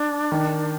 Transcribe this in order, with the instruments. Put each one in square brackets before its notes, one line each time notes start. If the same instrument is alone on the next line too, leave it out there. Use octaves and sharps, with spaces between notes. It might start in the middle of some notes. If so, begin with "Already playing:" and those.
Already playing: [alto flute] D4
[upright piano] D#3